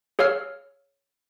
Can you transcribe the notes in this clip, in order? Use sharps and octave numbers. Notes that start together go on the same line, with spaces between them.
G#4 C#5 F5 E6 F6